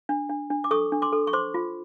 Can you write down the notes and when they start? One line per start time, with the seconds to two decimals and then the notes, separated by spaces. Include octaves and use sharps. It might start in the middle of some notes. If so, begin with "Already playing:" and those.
0.09 D4
0.29 D4
0.50 D4
0.64 D6
0.71 A4 C#6 D#6
0.92 D4
1.02 C6 D6
1.12 A4
1.27 C#6
1.33 C5 C6 D6
1.54 F4